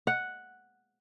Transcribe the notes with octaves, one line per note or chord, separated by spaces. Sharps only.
F#5